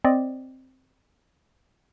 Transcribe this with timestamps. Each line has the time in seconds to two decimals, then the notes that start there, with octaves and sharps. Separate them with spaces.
0.04 C4 D5 D#5